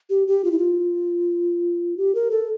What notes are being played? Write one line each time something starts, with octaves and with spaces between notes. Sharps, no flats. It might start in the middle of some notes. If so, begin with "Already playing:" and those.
G4
G4
F4
E4
F4
G4
A#4
A4